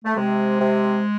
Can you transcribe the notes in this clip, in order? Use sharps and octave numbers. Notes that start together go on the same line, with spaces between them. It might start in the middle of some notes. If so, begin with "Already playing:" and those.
A3
C3 G#3
C3